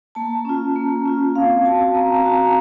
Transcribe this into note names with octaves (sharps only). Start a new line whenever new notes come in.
A#3 A5
C#4 F4
A#3
C#4 F4
C4 F5
F#4 A5
C4 A#5
A5
F#4
A#5